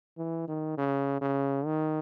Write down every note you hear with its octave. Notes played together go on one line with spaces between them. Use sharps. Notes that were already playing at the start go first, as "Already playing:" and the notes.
E3
D#3
C#3
C#3
D#3